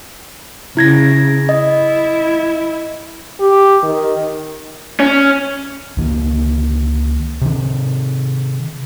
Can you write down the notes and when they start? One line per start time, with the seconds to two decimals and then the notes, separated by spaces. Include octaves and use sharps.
0.77 C#3 E4 G#6 A#6
1.49 E4 D#5
3.40 G4
3.83 D#3
5.00 C#4
5.97 C#2 D#3 A#3
7.41 C3 D#3